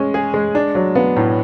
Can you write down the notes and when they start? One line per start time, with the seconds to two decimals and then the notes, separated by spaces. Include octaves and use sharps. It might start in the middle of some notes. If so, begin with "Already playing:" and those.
Already playing: G#3 C#4
0.14 G#4
0.34 G#3
0.55 D4
0.75 F#3
0.95 B3
1.17 A2